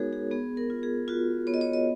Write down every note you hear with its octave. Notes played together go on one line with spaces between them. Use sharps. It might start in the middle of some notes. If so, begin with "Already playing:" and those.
Already playing: G#3 B3 D#4 F#4 G#4 A#4 C#5
G#4
B3 G#4
A#4
F4
G#4
F4 F#4
B3 C#5
D#5
C#5
D#5